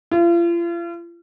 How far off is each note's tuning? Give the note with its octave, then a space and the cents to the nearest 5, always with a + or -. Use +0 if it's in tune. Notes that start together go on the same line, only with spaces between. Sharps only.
F4 -40